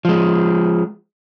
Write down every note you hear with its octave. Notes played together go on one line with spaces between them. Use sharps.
F3 G#3